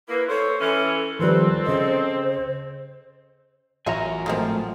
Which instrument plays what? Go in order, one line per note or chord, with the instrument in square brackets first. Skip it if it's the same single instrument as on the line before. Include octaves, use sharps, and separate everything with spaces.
[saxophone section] A#3 E4 [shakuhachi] B4
[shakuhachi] A4 [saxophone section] C5 C#5
[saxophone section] E3 C#4 [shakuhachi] A4
[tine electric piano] D#3 F3 G3 [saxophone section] C4 A4 [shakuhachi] B4
[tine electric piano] C#3 D#5 [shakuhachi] C5
[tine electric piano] A1 A#5 [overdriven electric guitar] F#3 G#5 [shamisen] F4 C#5 E5
[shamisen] D#3 A#3 C4 [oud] F3 A3